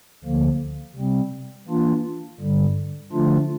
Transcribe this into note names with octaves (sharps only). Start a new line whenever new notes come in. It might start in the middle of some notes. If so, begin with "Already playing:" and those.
D2 D3 F3 A#3
C3 G3 C4
E3 A#3 D4 F4
G2 D3 G3
D3 F3 A3 D4 F4